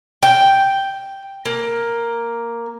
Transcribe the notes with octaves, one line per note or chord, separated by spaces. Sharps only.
G5
A#3